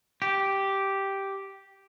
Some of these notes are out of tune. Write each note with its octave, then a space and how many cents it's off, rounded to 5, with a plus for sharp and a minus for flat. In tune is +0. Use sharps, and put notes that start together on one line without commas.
G4 -5